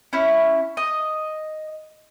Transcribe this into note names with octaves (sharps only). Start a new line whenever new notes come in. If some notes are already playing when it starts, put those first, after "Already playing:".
C#4 E4
D#5